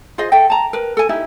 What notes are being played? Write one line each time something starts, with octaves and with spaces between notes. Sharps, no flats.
F4 G#4 C5 D#5
A4 E5 G5
A5 A#5
A#4 B4
A4 G#5
D#4 E4 G4